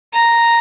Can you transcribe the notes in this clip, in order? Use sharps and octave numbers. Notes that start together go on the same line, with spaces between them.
A#5